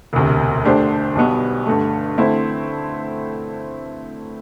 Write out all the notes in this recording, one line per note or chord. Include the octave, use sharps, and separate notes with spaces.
E1 D2 C3
D3 A3 D4 G4 C5
B1 B2 G3 B3
G2 D3 A3
D3 A3 C4 E4